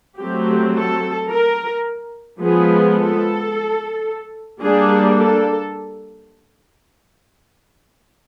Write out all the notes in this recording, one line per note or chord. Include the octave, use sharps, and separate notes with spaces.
F#3 A3 C4 G4
A4
A#4
F3 G#3 B3 G#4
A4
G3 A#3 D4 G#4
A4